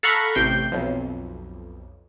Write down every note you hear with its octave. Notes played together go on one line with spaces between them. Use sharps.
A4 F5 F#5 A#5 B5 C#6
A1 C3 G5 G6 C7
B1 F2